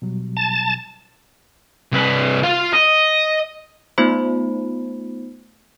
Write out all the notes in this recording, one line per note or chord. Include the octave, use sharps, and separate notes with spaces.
B2 F#3 G3
A5
C2 B4
F4 F5
D#5
A3 B3 D#4 F4 C5 B5